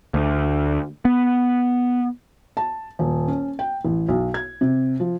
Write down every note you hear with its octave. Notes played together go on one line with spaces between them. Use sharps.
D2
B3
A5
D#1
C#4
G5
A1
B1
G#6
C3
F3